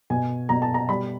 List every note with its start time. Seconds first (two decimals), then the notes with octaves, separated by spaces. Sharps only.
0.10 B2 G#5
0.49 B2 A#5
0.62 A5
0.74 A#5
0.89 G3 B5